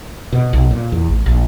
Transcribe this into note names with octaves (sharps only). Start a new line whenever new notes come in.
B2
B1
A#2
E2
A1
A#1